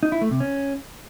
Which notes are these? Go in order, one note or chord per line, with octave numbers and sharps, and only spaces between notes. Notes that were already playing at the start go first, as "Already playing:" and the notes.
D#4
E4
A3
C3
C#4